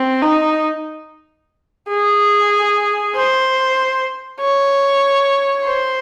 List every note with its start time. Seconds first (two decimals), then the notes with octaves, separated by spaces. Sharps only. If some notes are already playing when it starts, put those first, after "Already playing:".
Already playing: C4
0.22 D#4
1.89 G#4
3.15 C5
4.41 C#5
5.65 C5